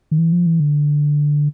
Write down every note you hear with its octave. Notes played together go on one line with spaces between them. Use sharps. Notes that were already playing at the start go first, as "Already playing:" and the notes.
D#3
E3
F3
E3
D3